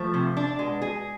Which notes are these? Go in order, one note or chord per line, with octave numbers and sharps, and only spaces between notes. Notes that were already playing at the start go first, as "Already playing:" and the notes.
Already playing: F3 A3
C3
D4
B2 G#3
G#4